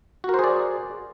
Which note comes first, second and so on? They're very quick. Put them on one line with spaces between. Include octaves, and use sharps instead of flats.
F#4 A#4 C5 G#4 D5